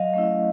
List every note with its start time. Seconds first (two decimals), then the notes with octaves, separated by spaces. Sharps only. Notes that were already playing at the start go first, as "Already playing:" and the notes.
Already playing: F#3 D#5 F5
0.14 A3 C#4 E4